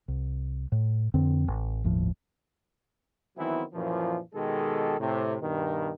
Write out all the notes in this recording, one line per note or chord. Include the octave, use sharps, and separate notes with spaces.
C2
A2
F2 D3 C4
A1
G1 D#2 A2 F3
D#3 E3 F#3 B3 C4 E4
F#2 A#2 E3 F3
B2 D#3 G#3 G4 A4
A2 C3
G2 B2 D#3